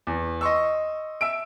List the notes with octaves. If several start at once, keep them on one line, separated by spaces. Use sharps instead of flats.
E2
D#5 C6 C#6 E6
E5 E6 D7